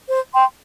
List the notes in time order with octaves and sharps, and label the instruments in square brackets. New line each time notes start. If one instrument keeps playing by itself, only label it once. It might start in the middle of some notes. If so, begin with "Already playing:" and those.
[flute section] C5
G5 C6